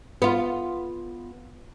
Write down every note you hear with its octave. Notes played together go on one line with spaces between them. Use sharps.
B3 F4